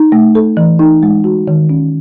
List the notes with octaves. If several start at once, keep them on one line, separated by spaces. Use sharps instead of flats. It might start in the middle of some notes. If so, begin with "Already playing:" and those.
Already playing: D#4
A3
A4
E3
D#4
G#3
F#4
D#3
C#4